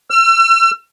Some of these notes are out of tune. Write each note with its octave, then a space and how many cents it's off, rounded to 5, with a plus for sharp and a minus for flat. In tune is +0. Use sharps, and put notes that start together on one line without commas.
E6 +45